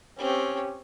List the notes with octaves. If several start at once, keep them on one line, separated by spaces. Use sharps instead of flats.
C4 C#4 G4 C#5